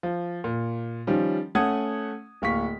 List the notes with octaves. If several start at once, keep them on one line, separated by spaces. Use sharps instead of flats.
F3
A#2
D#3 F3 G3 C#4
A3 C#4 F#5 D#6 G#6
D1 A#3 C#6 B6